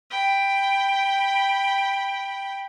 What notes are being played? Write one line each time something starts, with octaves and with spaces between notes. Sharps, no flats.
G5 B5